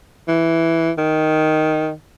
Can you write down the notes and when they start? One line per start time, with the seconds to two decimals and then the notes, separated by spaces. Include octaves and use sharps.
0.28 E3
0.98 D#3